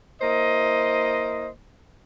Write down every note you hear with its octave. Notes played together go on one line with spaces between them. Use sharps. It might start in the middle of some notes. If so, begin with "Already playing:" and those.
A#3 E4 C5 D#5